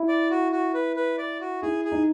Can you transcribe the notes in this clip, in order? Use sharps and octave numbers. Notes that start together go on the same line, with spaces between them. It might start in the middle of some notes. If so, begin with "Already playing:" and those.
Already playing: E4
D5
F#4
F#4
B4
B4
D5
F#4
E4 G#4
G#4
D#4